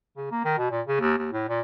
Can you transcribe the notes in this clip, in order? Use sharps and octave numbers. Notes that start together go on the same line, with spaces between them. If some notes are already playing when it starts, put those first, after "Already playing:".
C#3
A#3
D#3
B2
A#2
C#3
D#2
D#2
A2
A#2